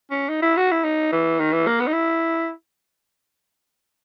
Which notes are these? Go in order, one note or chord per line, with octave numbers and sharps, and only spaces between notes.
C#4
D#4
E4
F#4
E4
D#4
E3
D#3
E3
A#3
B3
D#4
E4